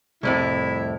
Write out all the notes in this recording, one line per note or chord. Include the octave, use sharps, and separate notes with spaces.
C2 F2 A2 E4